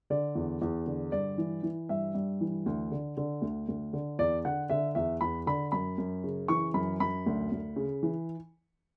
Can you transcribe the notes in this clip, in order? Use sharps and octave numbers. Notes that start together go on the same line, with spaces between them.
D3 D5
E2
E2
D3
G2 D5
E3
E3
G2 E5
G2
E3
D2
D3
D3
D2
D2
D3
E2 D5
D3 F#5
D3 E5
E2 E5
E2 B5
D3 B5
F#2 B5
F#2
C#3
E3 C#6
F#2 B5
F#2 B5
D2
D2
C#3
E3